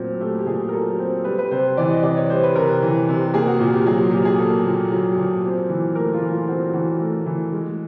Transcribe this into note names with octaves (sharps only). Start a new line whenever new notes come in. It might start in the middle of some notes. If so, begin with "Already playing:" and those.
Already playing: A#2 F#3 A3 C4
A3 G4
G4
A#2 G#4
A#4
F#3 A4
C4
G3 B4
B4
C3 C5
E3 D5
D#5
C3 D5
C#5
G3 C5
B4
C3 A#4
E3
C3
A#3 G#4
F#4
A#2
G4
F#3 G#4
A#2 G4
G#4
A#3 A4
A#2
F#3
A#2
C4
E3
A3 A#4
F4
E3
F4
C4 F#4
E3 F#4
A3
E3
G#3